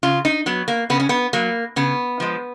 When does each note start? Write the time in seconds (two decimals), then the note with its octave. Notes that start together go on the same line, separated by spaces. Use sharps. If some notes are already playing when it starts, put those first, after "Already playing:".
0.03 C#3 F4
0.25 D#4
0.46 F#3 B3
0.68 A#3
0.90 C#3 B3
1.00 C#4
1.09 B3
1.33 F#3 A#3
1.76 C#3 B3
2.20 F3 G#3